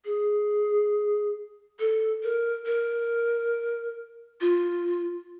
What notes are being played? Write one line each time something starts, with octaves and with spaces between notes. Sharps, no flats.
G#4
A4
A#4
A#4
F4